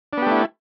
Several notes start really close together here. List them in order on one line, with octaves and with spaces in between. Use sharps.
D4 B3 G4 A3 E4